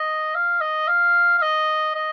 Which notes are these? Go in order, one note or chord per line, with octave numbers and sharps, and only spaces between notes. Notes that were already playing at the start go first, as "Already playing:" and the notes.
Already playing: D#5
F5
D#5
F5
F5
D#5
D#5